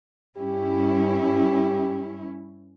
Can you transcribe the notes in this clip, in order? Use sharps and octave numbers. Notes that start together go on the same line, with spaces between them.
G2 C#4 E4 G4